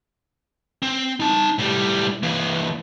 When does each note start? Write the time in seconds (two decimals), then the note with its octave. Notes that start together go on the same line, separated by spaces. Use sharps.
0.82 C4
1.20 D#4 A5
1.58 A2 G3
2.23 E3 A#3